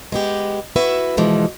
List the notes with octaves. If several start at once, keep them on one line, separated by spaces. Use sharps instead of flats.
G#3 B3 G4
E4 F#4 B4 E5
B2 D3 E3 F3 G#3